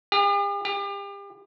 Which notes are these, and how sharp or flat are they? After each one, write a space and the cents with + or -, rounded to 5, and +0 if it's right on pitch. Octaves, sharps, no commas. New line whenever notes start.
G4 +45
G4 +35